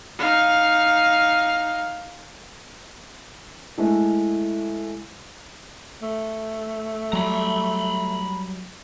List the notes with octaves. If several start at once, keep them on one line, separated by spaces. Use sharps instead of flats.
D#4 F5
G#3 A3 E4
A3
F#3 G3 A#5 B5